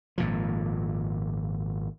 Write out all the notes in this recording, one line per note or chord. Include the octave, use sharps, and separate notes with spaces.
G#1 A#2 F3